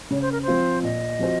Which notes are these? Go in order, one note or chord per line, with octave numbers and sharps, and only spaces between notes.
C#3 C#5
C5
A#4
C5
F3 C4 F4
A#2 D#5
F3 C4 F#4 C5